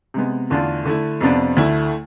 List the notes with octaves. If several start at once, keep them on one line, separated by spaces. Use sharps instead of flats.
C3 G#3 B3
E2 D3 A3 D4 F4
D3 A3 E4
F2 C3 F3 B3 D4
D2 D3 A3 E4